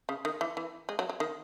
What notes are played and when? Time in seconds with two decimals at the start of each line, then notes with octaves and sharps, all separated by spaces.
0.09 C#3
0.25 D#3
0.41 E3
0.57 E3
0.89 G#3
0.99 F#3
1.09 F#3
1.20 D#3